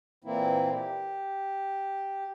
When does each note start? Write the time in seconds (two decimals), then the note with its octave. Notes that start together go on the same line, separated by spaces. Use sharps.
0.24 A#2 E3 A#3 C4 E4
0.73 G4